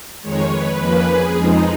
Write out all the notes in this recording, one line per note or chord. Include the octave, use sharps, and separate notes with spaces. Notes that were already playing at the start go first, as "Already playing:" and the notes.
F2 D#3 G#3 C#5
B4
F2 F3 A#3 C#4 B4
G#4
F2 F3 G#3 D#4